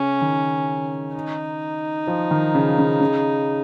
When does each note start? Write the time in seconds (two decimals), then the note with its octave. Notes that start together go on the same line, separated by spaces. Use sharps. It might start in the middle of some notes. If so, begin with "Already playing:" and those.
Already playing: C#3 C#4
0.21 D#3
1.14 D#4
2.08 F3
2.31 D#3
2.55 C#3
2.78 C#3
3.01 C#3